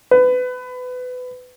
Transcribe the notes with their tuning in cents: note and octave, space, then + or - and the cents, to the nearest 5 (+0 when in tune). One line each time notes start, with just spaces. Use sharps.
B4 +25